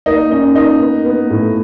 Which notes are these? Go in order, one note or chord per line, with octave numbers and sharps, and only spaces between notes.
A#3 D#4
C#4 D#4
A#3 D#4
B3
B3
A2